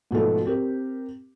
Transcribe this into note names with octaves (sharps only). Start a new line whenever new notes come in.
G#2 B2 F3 A3
C4 G4 A#4